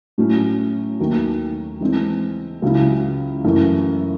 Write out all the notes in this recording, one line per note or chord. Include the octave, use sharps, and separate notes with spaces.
A2 F#3 A3 C#4
D#2 D#3 F#3 A3
E3 G#3 C4
C#2 C#3 F#3 C#4 E4
F#2 E3 A3 C#4 E4